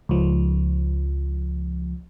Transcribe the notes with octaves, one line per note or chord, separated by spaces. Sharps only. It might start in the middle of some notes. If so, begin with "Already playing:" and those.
C#2 F3